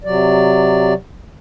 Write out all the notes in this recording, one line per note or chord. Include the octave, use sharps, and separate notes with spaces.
C3 F#3 D5